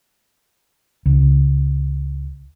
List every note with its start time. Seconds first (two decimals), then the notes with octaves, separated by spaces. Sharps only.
1.06 C#2